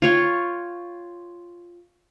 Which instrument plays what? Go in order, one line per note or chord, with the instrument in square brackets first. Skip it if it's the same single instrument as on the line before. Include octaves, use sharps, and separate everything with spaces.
[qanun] F4 C#5 G5